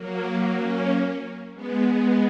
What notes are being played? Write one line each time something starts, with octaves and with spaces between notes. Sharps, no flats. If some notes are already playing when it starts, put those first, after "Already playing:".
Already playing: F#3 A#3
A#3 C#4
G#3 B3
G#3 B3